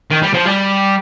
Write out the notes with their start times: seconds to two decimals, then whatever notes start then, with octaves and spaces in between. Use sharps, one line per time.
0.11 D#3
0.22 G3
0.34 F3
0.45 G3